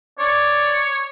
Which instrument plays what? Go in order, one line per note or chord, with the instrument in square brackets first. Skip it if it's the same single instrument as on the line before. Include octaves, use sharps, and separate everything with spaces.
[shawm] C#5 [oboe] D5